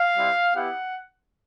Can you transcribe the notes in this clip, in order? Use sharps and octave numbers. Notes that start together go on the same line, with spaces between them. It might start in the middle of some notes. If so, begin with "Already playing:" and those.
Already playing: F5
G3 C4 E4
B3 E4 G4 F#5